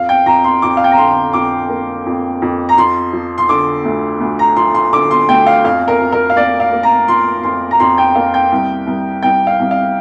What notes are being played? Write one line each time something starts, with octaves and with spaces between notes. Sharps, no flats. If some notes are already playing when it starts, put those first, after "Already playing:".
Already playing: F2 F5
G5
F2 A#5
C6
F2 D6
F5
G5
A#5
D3 C6
F2 D6
A#3
F2
F2
A#5
F3 C6
F3
C6
D3 D6
D2
D2
A#5
F3 C6
C6
D3 D6
C6
D2 G5
F5
F2 F5
A#4
F2
A#4
F5
A#3 D5
F5
A#3
A#5
F3 C6
F2 C6
A#5
F2 C6
G5
A#3 F5
G5
C2
C2
C2 G5
F5
C2
F5